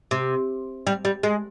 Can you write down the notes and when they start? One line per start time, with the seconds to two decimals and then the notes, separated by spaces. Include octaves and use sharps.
0.11 C3
0.87 G3
1.05 G3
1.23 G#3